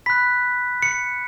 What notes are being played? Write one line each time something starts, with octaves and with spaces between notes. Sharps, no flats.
B5 F#6 B6
C#7